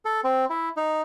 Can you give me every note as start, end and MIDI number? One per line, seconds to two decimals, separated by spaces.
0.05 0.21 69
0.24 0.45 60
0.50 0.69 64
0.77 1.02 63